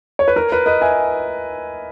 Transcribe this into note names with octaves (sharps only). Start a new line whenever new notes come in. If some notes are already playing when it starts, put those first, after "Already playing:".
C#5
B4
A#4
B4
B4 D#5
E5 G#5